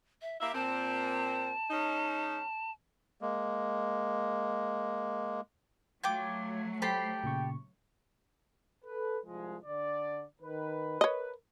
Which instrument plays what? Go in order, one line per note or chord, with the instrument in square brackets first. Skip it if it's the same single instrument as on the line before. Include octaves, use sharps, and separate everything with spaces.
[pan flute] E5
[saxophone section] A#3 G4 E5 [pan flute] F5
[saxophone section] A#2 C4 [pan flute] A5
[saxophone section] G#3 C#4 D#4
[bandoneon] G#3 A#3
[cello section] F#3 A3 [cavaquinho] F4 G5 D6 [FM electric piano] G#6
[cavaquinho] G4 A4 B5 [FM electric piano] C5 C7 [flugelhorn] G5
[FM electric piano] A#2 C#3 C#6
[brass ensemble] A4 B4
C2 F3 G#3
D3 D5
D#3 B4
[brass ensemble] A#4 B4 [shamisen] C#5 D#5